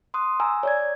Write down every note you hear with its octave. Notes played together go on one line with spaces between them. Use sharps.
C6 D#6 F#6
G#5 A#5 E6
C#5 D5 G#6